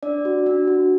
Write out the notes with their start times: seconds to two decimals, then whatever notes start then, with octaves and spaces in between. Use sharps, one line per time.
0.03 D4 D5
0.25 F#4
0.46 D4
0.67 F#4